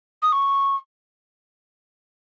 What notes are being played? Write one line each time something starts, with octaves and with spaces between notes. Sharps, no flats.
D#6
C#6